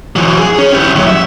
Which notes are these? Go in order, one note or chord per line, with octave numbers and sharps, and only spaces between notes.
E3 F#3
G#4
C#4
E4 G4
D#2 F#3
E5